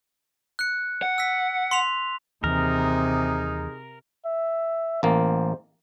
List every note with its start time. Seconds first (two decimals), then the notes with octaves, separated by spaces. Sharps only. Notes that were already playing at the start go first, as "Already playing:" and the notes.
0.59 F#6 C#7
1.02 F#5
1.18 E6 B6
1.71 C6 B6 F7
2.44 D#2 C3 E3 D#4 G#4 A#4
4.26 E5
5.03 A1 A#3 C5